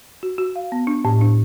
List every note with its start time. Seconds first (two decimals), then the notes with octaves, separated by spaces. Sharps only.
0.23 F#4
0.38 F#4
0.56 F5
0.72 B3
0.87 D4
1.05 A2
1.21 D4